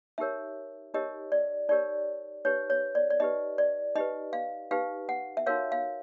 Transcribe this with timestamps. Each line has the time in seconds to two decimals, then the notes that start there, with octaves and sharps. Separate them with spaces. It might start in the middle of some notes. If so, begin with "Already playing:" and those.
0.18 D#4 G4 A#4 C#5 E5
0.94 D#4 G4 A#4 C#5 D#5
1.32 D5
1.69 D#4 G4 A#4 C#5 D5
2.45 D#4 G4 B4 C#5
2.70 C#5
2.95 D5
3.10 D5
3.20 D#4 G4 B4 D#5
3.58 D5
3.96 D#4 G4 B4 D#5
4.33 F5
4.71 D#4 G4 B4 F5
5.09 F#5
5.37 E5
5.46 D#4 F#4 A#4 C#5 F5
5.72 F5